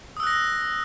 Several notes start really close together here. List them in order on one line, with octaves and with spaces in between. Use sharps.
D#6 E6 F#6 A#6